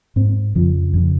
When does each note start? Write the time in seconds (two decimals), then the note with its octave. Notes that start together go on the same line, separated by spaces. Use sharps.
0.16 G#2 C4
0.55 F2 C#3 F3
0.94 F2 C#3